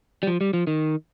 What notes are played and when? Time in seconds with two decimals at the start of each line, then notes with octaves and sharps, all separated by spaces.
0.23 G3
0.27 F3
0.41 G3
0.53 F3
0.67 D#3